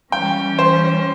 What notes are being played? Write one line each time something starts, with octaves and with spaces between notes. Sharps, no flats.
E3 G3 C#4 G5
C5